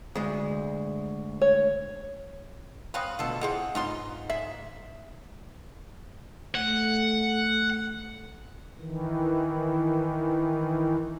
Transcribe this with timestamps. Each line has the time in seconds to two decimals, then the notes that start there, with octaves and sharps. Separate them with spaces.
0.15 D2 G#3
1.42 C#5
2.94 C4 C#4 B4 F5 D#6
3.19 D2 B2 F4 A4
3.41 E3 C4 F4 G#4 D#5 F#5
3.75 G#2 B3 D#4 F4 C6
4.30 G#4 E5
6.55 A3 F#5
8.79 D#3 E3